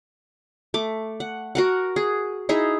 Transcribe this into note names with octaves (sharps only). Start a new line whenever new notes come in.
A3 D6
F#5
F#4 A#4 F#5
G#4
D#4 E4 G#4 E5